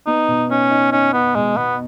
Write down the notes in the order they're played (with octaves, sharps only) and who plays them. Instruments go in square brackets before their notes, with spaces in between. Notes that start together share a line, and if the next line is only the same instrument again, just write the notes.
[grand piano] B3 [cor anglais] D#4
[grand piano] B2
[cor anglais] C#4 [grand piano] D#4
[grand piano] D#4
[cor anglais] C#4 [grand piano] D#4
[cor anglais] B3 [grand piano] D#4
[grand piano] B2 [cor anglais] G#3
[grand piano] B2 [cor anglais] B3